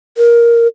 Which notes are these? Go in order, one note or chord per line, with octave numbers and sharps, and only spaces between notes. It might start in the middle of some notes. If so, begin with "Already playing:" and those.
A#4